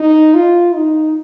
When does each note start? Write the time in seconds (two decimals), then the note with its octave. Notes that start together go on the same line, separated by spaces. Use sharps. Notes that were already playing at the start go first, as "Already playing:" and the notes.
Already playing: D#4
0.34 F4
0.75 D#4